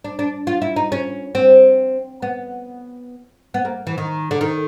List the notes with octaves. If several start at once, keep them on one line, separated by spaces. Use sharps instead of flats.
D4
D4
F4
E4
D#4
C#4
C4
B3
B3
A#3
E3
D#3
D3
D#3